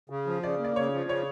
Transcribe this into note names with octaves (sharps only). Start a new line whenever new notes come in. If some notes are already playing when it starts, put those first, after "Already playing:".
C#3
F3
C#3 D5
A#3
D5
C#3 C#5
F3
C#3 C#5